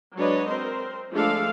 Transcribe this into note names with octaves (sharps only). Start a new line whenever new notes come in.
F#3 G#3 D4 B4 C#5 D#5
C4 A#4 C5
F3 G#3 A3 D4 A4 F5